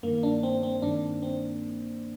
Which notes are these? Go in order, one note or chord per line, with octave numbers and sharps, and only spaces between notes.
G2 D#3 A#3
D4
C4
C4
G2 D#3 D4
C4